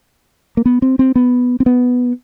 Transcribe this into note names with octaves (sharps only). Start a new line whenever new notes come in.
A#3
B3
C4
C4
B3
C4
B3